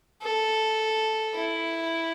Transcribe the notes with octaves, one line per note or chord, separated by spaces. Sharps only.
A4
E4